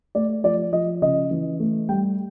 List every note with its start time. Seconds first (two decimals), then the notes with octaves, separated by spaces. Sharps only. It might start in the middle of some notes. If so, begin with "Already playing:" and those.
0.15 A3 D5
0.44 F3 D5
0.73 F3 D#5
1.02 C#3 D#5
1.31 E3
1.60 A3
1.89 G3 G5